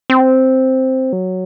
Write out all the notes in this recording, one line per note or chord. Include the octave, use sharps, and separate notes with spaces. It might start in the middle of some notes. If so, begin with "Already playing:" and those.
C4
F#3